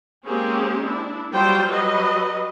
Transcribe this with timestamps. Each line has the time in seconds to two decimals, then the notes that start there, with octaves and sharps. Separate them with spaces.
0.24 G#3 A#3 C4 C#4 G4 G#4
0.84 D4 E4
1.32 F#3 G3 F4 C5 G5
1.68 F#3 G3 B4 D#5